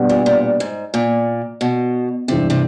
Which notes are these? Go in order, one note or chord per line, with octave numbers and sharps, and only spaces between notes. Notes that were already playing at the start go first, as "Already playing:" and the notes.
Already playing: B2 G3 B3 D4
A#2
A#2
G#2
A#2
B2
G2 C3 E3 G#3 C4
C3